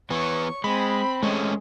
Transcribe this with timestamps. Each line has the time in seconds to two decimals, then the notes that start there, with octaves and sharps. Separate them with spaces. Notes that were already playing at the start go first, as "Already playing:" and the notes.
0.10 E3 B3 C#5 C#6
0.64 G#3 C4 B5
1.23 G#3 A3 C#4